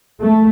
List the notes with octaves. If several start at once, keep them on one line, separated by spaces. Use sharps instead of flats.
A3